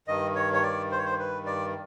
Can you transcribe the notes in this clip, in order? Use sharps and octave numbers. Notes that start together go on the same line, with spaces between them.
G2 D#3 D#5
C#5
C#5
D5
C5
C#5
C5
B4
D5